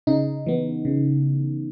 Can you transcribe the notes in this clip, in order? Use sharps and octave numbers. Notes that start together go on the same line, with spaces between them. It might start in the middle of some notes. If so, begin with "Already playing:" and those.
C#3 D#4
E3 B3
C#3